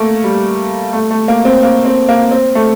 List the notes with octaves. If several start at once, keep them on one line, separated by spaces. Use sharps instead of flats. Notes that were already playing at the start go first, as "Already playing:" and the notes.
Already playing: A3 A#3
G3
A3
A3
A#3
C4
A#3
C4
A#3
C4
A3